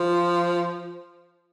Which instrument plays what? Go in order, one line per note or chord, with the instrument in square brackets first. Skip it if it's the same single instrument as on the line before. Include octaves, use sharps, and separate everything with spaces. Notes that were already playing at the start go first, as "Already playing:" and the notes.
Already playing: [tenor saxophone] F3